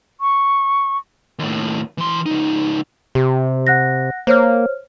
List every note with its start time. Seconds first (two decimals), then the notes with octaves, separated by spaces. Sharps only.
0.21 C#6
1.39 D#2 A2
1.98 E3 C6
2.26 C#2 D#4
3.15 C3 G4
3.67 F#5 F#6 A#6
4.27 A#3 C5 C#5 F6